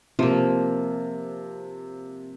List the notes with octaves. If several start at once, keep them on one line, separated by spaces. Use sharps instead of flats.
C3 F3 A#3